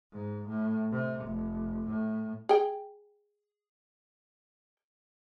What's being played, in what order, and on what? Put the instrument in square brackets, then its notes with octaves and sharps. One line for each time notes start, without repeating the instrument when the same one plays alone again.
[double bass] G#2
A2
C3
F1
A2
[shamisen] G#4 G5